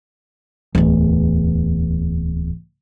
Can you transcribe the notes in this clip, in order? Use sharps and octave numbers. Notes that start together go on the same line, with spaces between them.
D1 E2